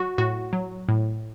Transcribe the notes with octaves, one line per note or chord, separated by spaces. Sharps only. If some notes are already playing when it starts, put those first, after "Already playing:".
Already playing: F#3 F#4
A2 F#4
F#3
A2